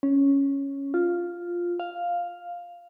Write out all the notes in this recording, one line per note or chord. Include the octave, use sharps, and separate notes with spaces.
C#4
F4
F5